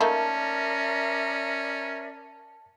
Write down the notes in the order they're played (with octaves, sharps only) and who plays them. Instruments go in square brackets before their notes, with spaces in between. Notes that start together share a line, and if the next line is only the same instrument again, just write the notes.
[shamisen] A3 A#3 D#4 [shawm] C#4 [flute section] A#4 D5 E5 [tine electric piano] A5